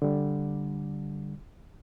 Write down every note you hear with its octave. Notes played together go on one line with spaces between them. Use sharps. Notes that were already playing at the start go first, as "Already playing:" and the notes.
D3 G3